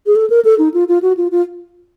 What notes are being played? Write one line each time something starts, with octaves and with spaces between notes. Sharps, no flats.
G#4
A4
A#4
A4
D#4
F4
F4
F#4
F4
F4